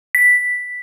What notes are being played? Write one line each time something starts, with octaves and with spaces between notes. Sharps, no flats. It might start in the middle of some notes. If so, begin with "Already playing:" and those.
B6